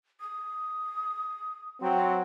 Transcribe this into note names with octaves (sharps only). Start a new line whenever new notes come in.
D#6
F#3 C4 F#5